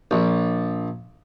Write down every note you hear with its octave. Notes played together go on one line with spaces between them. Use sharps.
A#1